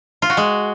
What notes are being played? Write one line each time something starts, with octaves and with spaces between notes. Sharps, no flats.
F4
F#4
G#3